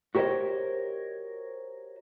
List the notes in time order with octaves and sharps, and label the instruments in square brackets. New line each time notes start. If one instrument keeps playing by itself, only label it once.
[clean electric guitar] F#4 G4 A#4 C5 C#5 D#5